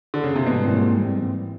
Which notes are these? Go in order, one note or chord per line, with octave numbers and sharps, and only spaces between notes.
D3
C#3
C3
G#2 B2 E3 G3 C4
A#2